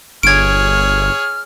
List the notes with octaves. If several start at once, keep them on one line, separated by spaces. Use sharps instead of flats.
G1 G#4 C#5 F6 G#6 D7